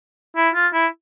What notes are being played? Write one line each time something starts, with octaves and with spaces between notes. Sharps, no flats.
E4
F4
E4